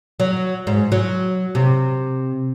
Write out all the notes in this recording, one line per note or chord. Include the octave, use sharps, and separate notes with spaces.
F#3
G#2
F#3
C3